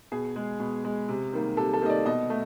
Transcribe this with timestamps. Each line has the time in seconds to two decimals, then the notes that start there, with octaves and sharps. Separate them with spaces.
0.12 B2 G#4
0.36 G#3
0.60 B2
0.84 G#3
1.09 C3
1.33 D#3 G3 A#3
1.57 C3 A4
1.73 A4
1.82 D#3 G3 A#3 D#5
1.90 D5
2.05 B2 D#5
2.30 A3